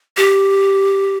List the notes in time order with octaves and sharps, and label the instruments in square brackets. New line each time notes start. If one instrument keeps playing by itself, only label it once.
[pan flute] G4